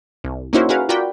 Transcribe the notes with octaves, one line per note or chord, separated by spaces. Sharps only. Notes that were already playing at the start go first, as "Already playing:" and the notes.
C2
A#3 C#4 D#4 E4 F#4 C5
F#4 G#4 A#4 B4 F5 F#5
F4 F#4 A#4 D5 G5 B5